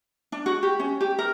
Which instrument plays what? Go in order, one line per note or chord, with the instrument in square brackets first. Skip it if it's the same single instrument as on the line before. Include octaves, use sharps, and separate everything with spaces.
[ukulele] D4
F#4
G4
C#4
G4
A#4